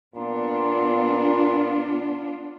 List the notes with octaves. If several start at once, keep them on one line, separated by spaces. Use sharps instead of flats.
A#2 B3 D4 F4